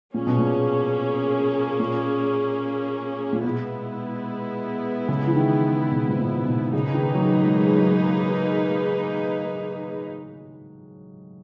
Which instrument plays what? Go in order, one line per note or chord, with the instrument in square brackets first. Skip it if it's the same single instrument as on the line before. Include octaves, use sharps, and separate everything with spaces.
[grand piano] A#2 [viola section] A#3 C#4 G#4
[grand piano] B2
A#2
A#2
A#2
[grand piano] B2 [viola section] G#3 B3 E4
[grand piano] C#3
E3
D#3
B2
G#2
A#2
B2
[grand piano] C#3 [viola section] A#3 D#4 G#4 B4
[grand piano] D#3
F#3
G#3
F#3
F#3